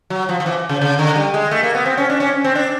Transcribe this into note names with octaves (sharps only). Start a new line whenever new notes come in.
F#3
F3
F3
E3
C#3
C#3
D3
G3
G#3
A3
A#3
B3
C4
C#4
D4
C#4
C4
D4